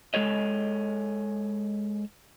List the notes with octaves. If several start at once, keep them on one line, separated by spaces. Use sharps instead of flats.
G#3 A4 C#5 D#5